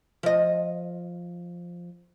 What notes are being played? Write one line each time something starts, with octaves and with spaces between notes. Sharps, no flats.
F3 D#5